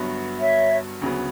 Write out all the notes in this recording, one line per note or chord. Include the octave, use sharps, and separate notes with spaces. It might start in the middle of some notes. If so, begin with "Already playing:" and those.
Already playing: G1 G2 F#3 B3 F#4
C#5 E5
D2 C#3 F#3 B3